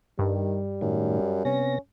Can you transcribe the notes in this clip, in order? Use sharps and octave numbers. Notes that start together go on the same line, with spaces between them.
G2 D#3 G3
F#2 A2 D#3
C3 B3 C#4 A#6